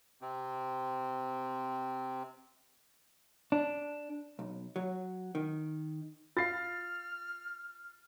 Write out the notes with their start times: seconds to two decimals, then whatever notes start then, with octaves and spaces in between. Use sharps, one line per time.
0.21 C3 C4
3.52 D4
4.39 B1
4.76 F#3
5.35 D#3
6.37 F4 F5 F6 A6 C7